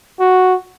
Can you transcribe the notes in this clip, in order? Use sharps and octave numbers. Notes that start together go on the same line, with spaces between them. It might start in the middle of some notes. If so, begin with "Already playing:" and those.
F#4